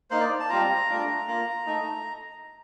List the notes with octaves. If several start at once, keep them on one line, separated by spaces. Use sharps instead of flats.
A#3 D#4 C5
D5
A5
G3 C4 F4 A#5
A3 D4 F4
A#3 F4
A3 D#4